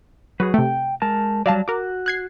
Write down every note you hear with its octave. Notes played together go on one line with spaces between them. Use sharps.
F#3 F#4 G#4 B4
C3 A3 G5
G#3 A#4 A5
F#3 G3 D5 F5 A5
F#4 A#4 D6
F#6 G#6 C7